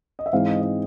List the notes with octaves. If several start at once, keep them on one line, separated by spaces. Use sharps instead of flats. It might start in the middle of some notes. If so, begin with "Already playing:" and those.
D#5
E5
G#2 E3 G#3 C4 D#4 F5
D#5
D#5